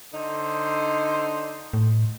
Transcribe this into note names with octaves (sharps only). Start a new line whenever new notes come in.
D3 D#4 C5
A2